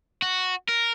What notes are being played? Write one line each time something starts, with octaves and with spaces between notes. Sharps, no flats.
F#4
A#4